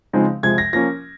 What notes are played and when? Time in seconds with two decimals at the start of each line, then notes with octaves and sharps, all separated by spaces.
0.13 C#3 F3 G#3 C4 D#4
0.43 C3 F3 G#3 G#6
0.58 A#6
0.73 F3 A#3 C#4 A#6